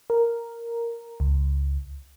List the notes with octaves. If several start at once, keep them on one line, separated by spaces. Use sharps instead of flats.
A#4
C#2